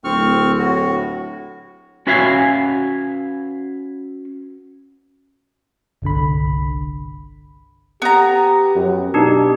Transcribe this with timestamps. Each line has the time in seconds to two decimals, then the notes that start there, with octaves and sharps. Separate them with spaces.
0.04 D1 C4 C#6 F6
0.59 A2 F#4
2.07 C#4 F#4 B4 E5 F5 G#5
6.02 G1 C2 D3 B5
8.02 B3 G4 A#5
8.75 F#2
9.14 B2 D4 D#4 G4